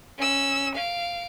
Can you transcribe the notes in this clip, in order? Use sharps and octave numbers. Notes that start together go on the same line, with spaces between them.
C#4 E6
F5 D7